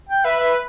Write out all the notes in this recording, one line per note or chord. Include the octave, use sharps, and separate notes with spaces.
G5
B4 E5
E5